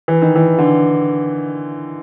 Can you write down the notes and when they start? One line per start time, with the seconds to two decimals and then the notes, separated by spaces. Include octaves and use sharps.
0.08 E3
0.22 D#3
0.36 E3
0.59 D3